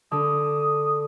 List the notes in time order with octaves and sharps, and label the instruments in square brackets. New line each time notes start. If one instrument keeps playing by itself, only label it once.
[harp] D3 A4 [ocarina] D#6